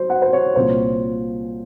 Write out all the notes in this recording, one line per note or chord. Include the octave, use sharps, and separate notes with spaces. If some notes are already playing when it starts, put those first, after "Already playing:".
Already playing: F#3 C5
F#5
C5
C#5
C2 A#2 F3 C5